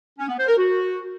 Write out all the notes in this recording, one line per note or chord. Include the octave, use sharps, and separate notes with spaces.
C#4
B3
C5
A#4
F#4